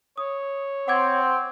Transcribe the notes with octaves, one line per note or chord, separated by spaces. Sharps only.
C#5 D#6
C4 F#5 D6 G#6